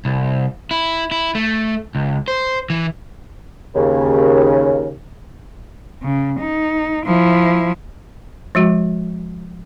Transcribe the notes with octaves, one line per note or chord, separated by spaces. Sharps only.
C2
E4
E4
A3
C#2
C5
E3
D#2 C#3
C#3
D#4
F3 E4
F3 G#3 F#4